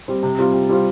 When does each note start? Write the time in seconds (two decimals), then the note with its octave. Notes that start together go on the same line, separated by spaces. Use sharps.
0.08 G3 C4
0.23 C3
0.39 G3 C4 F4
0.54 C3
0.69 G3 C4 F4